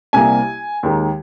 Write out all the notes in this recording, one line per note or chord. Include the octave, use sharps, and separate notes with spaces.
C2 C3 G3 A#3 G#5
D#2 D#3 G#3